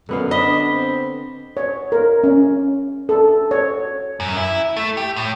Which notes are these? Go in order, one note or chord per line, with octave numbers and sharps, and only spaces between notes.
F#2 D3 B3 F5
D4 D#5 B5 B6 G7
C4
C#5
A#4
C#4
A4
C#5
F#2
E4
A3
G4
A2